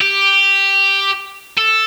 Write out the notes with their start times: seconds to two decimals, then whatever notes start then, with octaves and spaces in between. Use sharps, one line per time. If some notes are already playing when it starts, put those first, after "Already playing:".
0.01 G4
1.57 A4